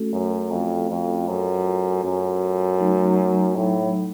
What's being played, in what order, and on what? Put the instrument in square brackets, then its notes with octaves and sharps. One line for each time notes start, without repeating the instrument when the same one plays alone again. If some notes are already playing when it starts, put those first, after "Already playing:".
Already playing: [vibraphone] A3 C#4 F#4 A4
[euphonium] F#2
F2
F2
[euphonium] F#2 [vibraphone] F4 A4 C5
[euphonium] F#2
[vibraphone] F#3 A3 D#4
[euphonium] A2